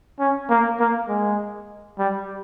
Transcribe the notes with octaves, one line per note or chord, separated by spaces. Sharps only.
C#4
A#3
A#3
G#3
G3